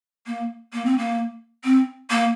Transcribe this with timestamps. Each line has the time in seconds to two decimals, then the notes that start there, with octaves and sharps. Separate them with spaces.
0.27 A#3
0.73 A#3
0.85 C4
0.98 A#3
1.64 C4
2.10 A#3